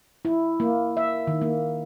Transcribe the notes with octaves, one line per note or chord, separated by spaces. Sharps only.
E4
A#3
E5
D#3
A#3